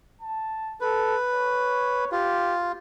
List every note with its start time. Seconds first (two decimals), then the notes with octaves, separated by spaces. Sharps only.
0.21 A5
0.81 A4 B4
1.33 C#5
2.12 F4 G4